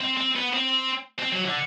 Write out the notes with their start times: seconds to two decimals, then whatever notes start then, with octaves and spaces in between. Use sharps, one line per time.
0.01 C4
0.18 C4
0.36 B3
0.53 C4
1.19 C4
1.32 F#3
1.45 D3